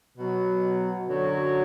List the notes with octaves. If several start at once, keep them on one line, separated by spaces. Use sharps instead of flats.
B2 F#3
F#2 D3 F#3